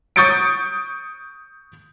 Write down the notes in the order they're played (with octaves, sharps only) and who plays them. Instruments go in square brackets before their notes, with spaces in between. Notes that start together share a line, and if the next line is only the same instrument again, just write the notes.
[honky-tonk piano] C#6 D#6 G6 A6 C#7 D7